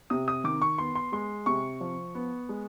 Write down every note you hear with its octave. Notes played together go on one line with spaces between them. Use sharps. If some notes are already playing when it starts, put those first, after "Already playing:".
C3 D#6
D#6
D#3 D6
C#6
B3 C6
C6
G#3 C6
C3 C#6
F3
B3
G#3